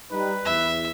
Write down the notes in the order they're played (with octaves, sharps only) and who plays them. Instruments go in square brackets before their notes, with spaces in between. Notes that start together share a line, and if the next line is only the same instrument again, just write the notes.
[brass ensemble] G3 D#4 [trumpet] B4
[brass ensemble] E2 [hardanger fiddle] E5